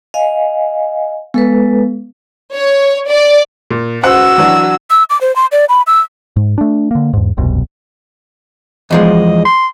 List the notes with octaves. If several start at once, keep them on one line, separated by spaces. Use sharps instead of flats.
D#5 F5 G#5
G#3 B3 A4 B4
C#5
D5
A#2
C#2 F#4 C5 F#5 E6
E3 F#3 D4
E6
D6
C5
C6
D5
B5
E6
G#2
A3 D4
D3 A#3
E2 G#2
E1 C2 F#2 B2
E2 F3 G#3 D#5
C6